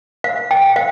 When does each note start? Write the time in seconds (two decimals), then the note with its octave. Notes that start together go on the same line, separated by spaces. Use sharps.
0.24 F5
0.51 G5
0.76 F5